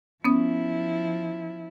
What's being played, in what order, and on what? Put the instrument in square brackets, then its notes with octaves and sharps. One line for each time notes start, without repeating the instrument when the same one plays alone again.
[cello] F3 E4 [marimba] B3 C#4 D#6